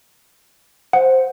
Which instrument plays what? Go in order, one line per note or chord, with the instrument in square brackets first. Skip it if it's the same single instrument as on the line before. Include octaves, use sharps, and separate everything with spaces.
[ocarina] C5 [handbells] F#5